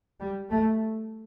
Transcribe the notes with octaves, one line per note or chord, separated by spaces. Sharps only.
G3
A3